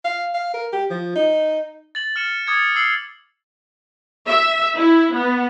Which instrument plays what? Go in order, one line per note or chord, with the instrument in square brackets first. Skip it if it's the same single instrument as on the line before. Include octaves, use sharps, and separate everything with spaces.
[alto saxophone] F5
F5
A#4
G4
F3
D#4
[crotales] A6 F#7
F6 C#7 E7
D6 D#6 G#6 A6 C#7
E6 C7 F#7
[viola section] E5
E4
B3